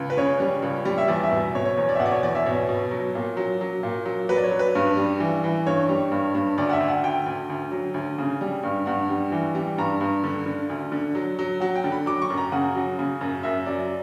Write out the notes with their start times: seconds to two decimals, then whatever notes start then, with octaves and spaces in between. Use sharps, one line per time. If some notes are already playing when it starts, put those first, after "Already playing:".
Already playing: C#2
0.10 B4
0.17 C#3 C#5
0.40 G3
0.62 C#2
0.85 G3
0.98 E5
1.08 E2 D5
1.23 E5
1.32 B2
1.55 B2 C#5
1.65 C#5
1.77 E2 C#5
1.89 D5
1.95 E5
2.00 B2 F#5
2.06 D5
2.12 C#5
2.22 E2 D5
2.35 E5
2.46 B2 C#5
2.69 B2
2.91 F#3
3.15 A#2
3.37 F#3
3.61 F#3
3.83 A#2
4.05 F#3
4.29 F#3 B4
4.37 D5
4.44 C#5
4.51 F#3
4.59 B4
4.75 G2
4.97 G3
5.20 E3
5.44 E3
5.66 G2 C#5
5.89 G3
6.12 G2
6.35 G2
6.58 D2 D5
6.69 F#5
6.73 E5
6.81 D2
6.88 F#5
7.04 D2 G5
7.26 D2
7.50 D2
7.72 F#3
7.94 D2
8.18 C#3
8.41 G3
8.63 G2
8.86 G2 F#5
9.09 G3
9.32 E3
9.55 G3
9.78 G2 A#5
10.01 G2
10.24 D3
10.46 D3
10.70 D2
10.92 D3
11.15 F#3
11.39 F#3
11.60 F#3 F#5
11.76 G5
11.84 D3
11.92 B5
12.06 F#3 D6
12.22 C#6
12.30 F#2
12.38 A#5
12.52 C#3 F#5
12.75 F#3
12.99 C#3
13.21 F#2
13.43 F#2 E5
13.66 F#3 D5